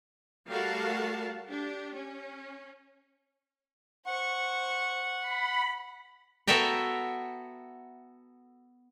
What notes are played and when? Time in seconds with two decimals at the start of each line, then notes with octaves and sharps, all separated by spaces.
0.48 G3 A3 F#4 A#4 F5 A5
1.45 D4 G4
1.95 C#4
4.06 C5 F#5 C#6
5.20 B5
6.47 B3 F#4 A4 E5 G5 A#5